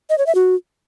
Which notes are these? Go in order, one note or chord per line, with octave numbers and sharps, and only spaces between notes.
D#5
C#5
E5
F#4